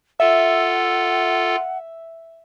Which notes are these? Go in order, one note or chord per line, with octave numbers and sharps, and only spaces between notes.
F4 A4 E5 F#5